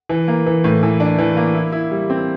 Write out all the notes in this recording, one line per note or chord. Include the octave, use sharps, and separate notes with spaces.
E3
A#3
E3
A2
E3
D4
E3
A#3
E4
E4
G3
C4